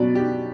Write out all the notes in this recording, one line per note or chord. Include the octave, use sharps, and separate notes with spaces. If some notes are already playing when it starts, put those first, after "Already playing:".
Already playing: B2 F#3 C#4 D5
G4